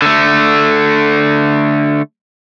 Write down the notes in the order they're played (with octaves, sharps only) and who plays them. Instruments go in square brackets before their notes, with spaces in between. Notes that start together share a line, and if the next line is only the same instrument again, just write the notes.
[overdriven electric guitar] D3 A3